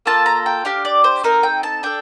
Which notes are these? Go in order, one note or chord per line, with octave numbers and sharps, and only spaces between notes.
A#3 F4 A4 A5
A#5
G5
D4 G4 F5
D5
C5
C4 D#4 A4 A#4
G5
A5
D4 A4 G5